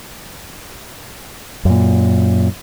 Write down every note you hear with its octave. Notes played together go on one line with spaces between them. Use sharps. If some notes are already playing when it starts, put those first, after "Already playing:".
F#2 A#2